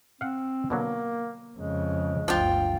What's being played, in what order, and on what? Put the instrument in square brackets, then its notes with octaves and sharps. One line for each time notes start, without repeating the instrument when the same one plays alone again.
[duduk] C4 [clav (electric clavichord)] F5 F#5
[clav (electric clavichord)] B2 D3 F#3 [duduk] A#3
[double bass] F2 C#3 [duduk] G#3
[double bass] G1 D2 [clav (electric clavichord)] F3 D4 [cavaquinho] F4 G5